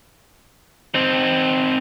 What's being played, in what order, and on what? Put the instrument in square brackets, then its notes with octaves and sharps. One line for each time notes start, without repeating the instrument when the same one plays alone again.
[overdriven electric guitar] C4 D#4